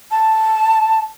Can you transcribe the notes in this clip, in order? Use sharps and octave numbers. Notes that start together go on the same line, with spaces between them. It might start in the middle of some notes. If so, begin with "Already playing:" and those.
A5